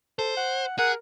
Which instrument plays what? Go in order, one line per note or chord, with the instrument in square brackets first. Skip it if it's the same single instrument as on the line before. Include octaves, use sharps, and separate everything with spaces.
[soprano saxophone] A4 [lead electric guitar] C5
[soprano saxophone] F#5
[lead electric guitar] G#4 [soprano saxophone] A#4 [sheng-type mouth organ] F#5